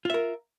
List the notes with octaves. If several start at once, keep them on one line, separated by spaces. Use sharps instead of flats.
F4 A#4 E5